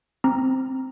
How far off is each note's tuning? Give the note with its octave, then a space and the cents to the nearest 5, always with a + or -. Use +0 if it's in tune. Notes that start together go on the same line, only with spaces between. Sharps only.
C4 +0 A#5 +0